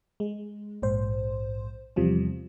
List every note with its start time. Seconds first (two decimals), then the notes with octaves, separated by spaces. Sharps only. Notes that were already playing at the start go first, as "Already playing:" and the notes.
0.20 G#3
0.82 A#1 G#2 C5
1.96 E2 C3 F3 G3